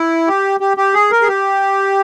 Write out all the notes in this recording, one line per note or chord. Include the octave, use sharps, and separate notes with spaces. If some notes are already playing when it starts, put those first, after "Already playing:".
Already playing: E4
G4
G4
G4
G#4
A#4
G#4
G4